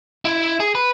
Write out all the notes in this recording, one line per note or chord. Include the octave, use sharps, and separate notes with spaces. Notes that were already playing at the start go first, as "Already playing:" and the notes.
E4
G#4
B4